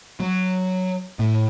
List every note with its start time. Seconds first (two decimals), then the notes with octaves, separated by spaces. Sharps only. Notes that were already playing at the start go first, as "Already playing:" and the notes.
0.20 F#3
1.19 A2